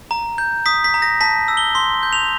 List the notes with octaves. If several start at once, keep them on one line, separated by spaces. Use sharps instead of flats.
A#5
G6
D#6 B6
B6
A#5
A#6
A5 B6
E6
G7
C6 G7
G6
F7